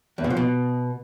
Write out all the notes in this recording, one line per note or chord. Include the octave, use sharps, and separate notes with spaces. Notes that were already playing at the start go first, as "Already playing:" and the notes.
E2
B2
F3
B2